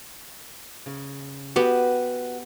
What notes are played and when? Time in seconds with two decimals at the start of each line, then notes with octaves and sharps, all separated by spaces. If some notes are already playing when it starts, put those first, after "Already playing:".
0.86 C#3
1.56 B3 F#4 G4 B4